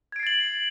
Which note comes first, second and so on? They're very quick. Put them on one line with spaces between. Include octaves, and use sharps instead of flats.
G#6 D7 C7 A6 F#7